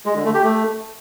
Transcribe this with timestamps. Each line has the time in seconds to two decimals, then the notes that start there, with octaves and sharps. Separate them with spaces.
0.06 G#3
0.15 D3
0.25 A3
0.34 G4
0.44 A3